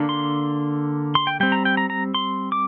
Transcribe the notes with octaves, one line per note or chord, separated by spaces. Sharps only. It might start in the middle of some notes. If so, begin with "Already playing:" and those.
Already playing: D3 A#3 D4
C6
C6
G5
G3 C4 G5
A#5
G5
A#5
A#5
C6
D6